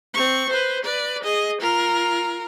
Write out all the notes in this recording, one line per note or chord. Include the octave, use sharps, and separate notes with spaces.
C4 C#6
B4 C5
B4 D5
G#4 D#5
F4 A#4